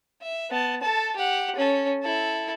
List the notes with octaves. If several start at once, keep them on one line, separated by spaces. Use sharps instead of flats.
E5
B3 A5
A4 A5
G4 F#5
C#4 A4
E4 A4